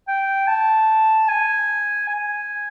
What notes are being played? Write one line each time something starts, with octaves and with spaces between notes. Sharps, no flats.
G5
A5
G#5
G#5